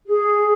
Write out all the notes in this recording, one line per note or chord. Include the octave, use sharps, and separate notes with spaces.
G#4